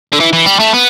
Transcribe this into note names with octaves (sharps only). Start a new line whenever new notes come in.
D3
E3
E3
G3
A3
B3